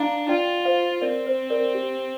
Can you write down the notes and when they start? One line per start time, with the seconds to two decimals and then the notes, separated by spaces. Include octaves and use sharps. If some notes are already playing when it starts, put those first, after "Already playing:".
Already playing: D4 F5 A#5
0.29 F4 D5 G5
0.65 C5 F5
1.02 C4 A#4 D5
1.26 C5
1.50 A#4 D5
1.75 G4